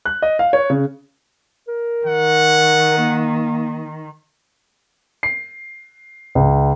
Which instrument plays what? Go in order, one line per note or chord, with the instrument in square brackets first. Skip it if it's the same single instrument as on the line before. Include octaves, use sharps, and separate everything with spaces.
[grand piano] F#6
D#5
F5
C#5
C#3
[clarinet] A#4
[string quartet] D#3 [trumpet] F#5
[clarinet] A#3
[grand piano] C7
C#2